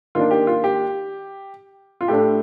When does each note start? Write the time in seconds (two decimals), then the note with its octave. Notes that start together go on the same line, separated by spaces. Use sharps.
0.15 D#3 A#3 D4 F4
0.31 G4
0.47 F4
0.64 G4
2.01 F4
2.08 A2 A3 D4 G4